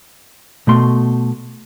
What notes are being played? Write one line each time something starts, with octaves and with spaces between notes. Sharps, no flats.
B2 A3 C6